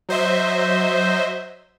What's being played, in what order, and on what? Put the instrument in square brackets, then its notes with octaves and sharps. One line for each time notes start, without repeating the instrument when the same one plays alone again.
[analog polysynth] F#3 C5 D#5 E5